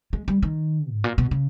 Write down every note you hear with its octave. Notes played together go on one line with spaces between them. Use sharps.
G#3
G3
D#3
G#2
A#2
B2
C#3